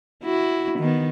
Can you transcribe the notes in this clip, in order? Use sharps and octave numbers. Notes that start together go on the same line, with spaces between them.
E4 F#4
D#3 B3